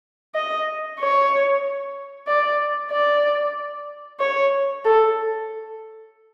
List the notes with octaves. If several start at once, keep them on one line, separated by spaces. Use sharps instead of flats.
D#5
C#5
D5
D5
C#5
A4